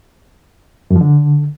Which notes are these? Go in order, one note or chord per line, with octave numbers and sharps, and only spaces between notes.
F#2
F3
D3